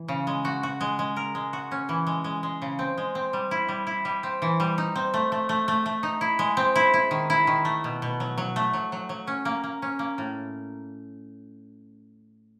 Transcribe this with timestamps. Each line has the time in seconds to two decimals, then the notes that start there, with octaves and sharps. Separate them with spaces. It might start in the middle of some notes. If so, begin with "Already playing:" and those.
Already playing: E3
0.08 C#3
0.27 G#3
0.45 F#4
0.63 F#4
0.81 G#3
0.99 G#3
1.17 A#4
1.35 G#3
1.53 F#4
1.72 C#4
1.89 E3
2.07 G#3
2.24 G#3
2.43 G#3
2.62 C#3
2.79 C4
2.98 G#3
3.15 C4
3.33 G3
3.51 E4
3.69 G3
3.87 E4
4.05 G3
4.23 C4
4.42 E3
4.60 G3
4.78 D#4
4.96 C4
5.14 A3
5.32 A3
5.49 A3
5.68 A3
5.86 A3
6.03 D#4
6.21 E4
6.39 G#3
6.57 C4
6.76 E4
6.94 E4
7.11 D#3
7.30 E4
7.47 D#3
7.65 A3
7.84 B2
8.02 B2
8.20 F#3
8.38 F#3
8.56 A3
8.73 F#3
8.92 F#3
9.09 F#3
9.27 C#4
9.45 A#3
9.64 A#3
9.82 C#4
9.99 A#3
10.18 A2